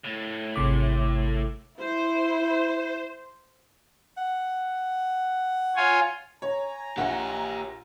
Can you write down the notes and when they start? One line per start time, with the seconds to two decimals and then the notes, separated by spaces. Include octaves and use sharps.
0.04 A2
0.56 G#1 C3 D6
1.80 E4 C5
4.17 F#5
5.76 F4 C#5 G#5
6.42 C#5 G#5 A#5
6.97 A#1 G4 C#5 F#5